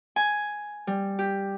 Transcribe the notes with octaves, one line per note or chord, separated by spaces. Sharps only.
G#5
G3
G4